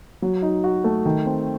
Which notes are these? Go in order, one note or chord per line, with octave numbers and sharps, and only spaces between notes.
F#3
D#4
F#4
A3
D#3
C4